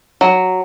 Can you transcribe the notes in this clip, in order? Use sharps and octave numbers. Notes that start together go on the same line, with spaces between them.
F#3